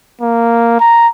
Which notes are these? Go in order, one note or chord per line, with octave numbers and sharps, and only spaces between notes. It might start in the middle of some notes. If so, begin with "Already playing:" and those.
A#3
A#5